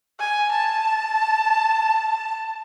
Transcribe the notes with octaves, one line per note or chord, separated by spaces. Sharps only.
G#5
A5